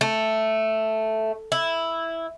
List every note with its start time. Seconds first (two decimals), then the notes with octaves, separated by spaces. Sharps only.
0.01 A3
1.52 E4